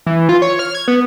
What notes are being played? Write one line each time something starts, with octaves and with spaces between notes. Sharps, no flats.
E3
F4
C#5
F6
G#6
B3